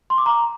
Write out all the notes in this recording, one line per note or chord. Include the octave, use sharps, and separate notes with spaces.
C6
D6
A#5